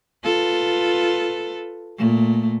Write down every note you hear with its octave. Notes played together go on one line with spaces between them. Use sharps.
F4 A4 B4
A#2 A3